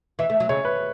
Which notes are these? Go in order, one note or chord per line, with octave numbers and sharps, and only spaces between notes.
E3 E5
A3
F#3
C#3 C#5
B4